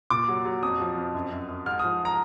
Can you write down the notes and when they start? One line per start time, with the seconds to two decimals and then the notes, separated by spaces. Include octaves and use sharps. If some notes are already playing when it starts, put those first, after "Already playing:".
0.10 A#2 D6
0.29 F#3
0.45 F#3
0.63 F2 D#6
0.80 F3
0.97 F2
1.14 F#2
1.32 F#2
1.49 F#2
1.66 G#2 F6
1.79 D#6
1.84 F3
2.05 A#5